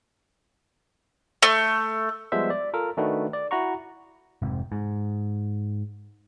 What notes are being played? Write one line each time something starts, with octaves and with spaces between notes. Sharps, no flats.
A3
F3 G3 G#3 B3 C5 E5
D5
F4 A4 A#4
D#3 A3 D4 D#4 F#4 B4
D5
E4 F#4 F#5 A#5 C#6
F1 G#2 C3
G#2